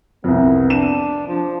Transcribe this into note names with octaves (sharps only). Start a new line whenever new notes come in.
C2 F2 B3
D4 D#7 E7
F3